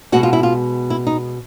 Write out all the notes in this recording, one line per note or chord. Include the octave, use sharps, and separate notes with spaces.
B2 G#3 F#4
F4
E4
F4
E4
D#4